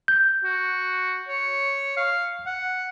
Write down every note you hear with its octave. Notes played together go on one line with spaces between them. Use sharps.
G6
F#4
C#5
F5
F#5